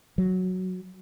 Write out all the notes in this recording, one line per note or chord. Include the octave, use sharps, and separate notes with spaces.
F#3